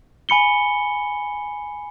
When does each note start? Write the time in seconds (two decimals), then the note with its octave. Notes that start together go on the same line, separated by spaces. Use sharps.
0.29 G#5 B5 C#7 G7